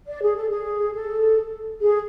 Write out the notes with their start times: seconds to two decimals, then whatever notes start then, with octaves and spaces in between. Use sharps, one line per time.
0.07 D5
0.21 G#4
0.36 A4
0.50 G#4
0.93 A4
1.80 G#4